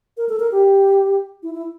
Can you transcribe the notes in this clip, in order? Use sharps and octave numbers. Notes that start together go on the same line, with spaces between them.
A#4
A4
A#4
G4
E4
E4